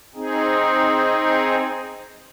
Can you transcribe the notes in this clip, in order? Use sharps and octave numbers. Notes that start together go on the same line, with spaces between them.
C4 D#4 G#4